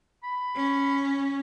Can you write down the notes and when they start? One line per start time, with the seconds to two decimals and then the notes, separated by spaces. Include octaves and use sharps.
0.23 B5
0.55 C#4